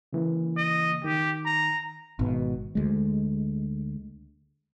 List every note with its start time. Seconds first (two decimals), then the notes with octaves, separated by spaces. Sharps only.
0.13 C#3 E3 A#3
0.57 D#5
1.04 D#3 G4
1.45 A#5
2.19 G#1 B2
2.75 D2 G#3